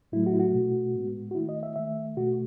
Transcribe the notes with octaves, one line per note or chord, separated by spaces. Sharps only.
A2 F#3 A3 E4
F#4
E4
F#4
B2 A3
A2 G#3 B3
F#4
D#3 A3 E4
D#5
E5
D#3 A3 E5
B2 A3 F#4